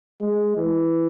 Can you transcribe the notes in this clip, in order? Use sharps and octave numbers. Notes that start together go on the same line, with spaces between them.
G#3
E3